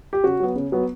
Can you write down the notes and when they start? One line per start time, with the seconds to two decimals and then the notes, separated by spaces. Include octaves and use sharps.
0.13 G4
0.23 C#3 F#4
0.40 F#3 B3
0.55 C#3
0.72 F#3 B3